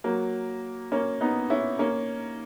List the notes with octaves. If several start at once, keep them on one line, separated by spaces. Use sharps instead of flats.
F#3 A#3
A#3 C#4
B3 D#4
C#4 E4
A#3 C#4